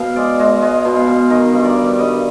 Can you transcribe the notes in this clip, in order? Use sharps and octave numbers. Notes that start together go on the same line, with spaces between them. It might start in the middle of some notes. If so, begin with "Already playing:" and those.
Already playing: B2 F5
G#3 D5
G#3 D#5
G#3 D#5
B2
F5
B2
D#3 D#5
G2
D5
G3
G2 D#5